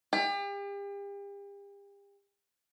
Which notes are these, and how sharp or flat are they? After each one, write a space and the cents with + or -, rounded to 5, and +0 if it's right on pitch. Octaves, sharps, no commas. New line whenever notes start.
G4 +40